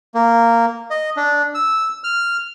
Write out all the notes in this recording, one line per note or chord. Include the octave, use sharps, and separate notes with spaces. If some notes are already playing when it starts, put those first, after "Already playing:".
A#3
D#5
D4
E6
F6